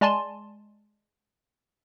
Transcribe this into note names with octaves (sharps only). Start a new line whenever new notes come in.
G#3 D5 G#5 A5 C6